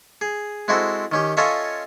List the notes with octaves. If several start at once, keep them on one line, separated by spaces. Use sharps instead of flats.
G#4
G#3 C4 E4 F#4 A4
D#3 C#4 G4
C#4 F4 A4 C#5 D#5 E5